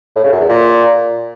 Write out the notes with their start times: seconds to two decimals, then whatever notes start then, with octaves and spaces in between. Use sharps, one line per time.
0.16 A2
0.24 C#3
0.33 F#2
0.41 E2
0.49 A#2